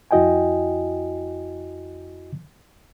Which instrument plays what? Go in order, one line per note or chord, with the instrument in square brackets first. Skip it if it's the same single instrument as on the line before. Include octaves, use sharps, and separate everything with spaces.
[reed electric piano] F2 E4 F#4 D#5 G5 G#5